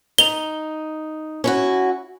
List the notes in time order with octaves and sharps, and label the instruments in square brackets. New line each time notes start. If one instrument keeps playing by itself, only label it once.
[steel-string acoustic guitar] D#4 [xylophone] F7 G7
[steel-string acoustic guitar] C#4 E4 F#4